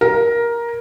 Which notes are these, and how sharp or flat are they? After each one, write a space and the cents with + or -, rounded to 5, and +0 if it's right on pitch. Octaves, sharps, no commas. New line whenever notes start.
A#4 +10